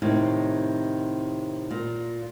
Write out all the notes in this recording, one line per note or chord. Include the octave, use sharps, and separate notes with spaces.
A2 C3 D#3
A#2